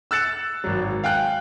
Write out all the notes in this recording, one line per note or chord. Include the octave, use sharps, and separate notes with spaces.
E6 F#6 A6 C#7 E7
G#1 F#3
F5 G5 G#5 F#6